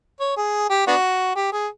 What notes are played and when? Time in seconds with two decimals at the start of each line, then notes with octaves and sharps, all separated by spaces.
0.20 C#5
0.37 G#4
0.70 G4
0.87 B3 D4 F#4
1.36 G4
1.52 G#4